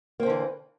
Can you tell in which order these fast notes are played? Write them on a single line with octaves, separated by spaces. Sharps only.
A#3 C4 D3 E3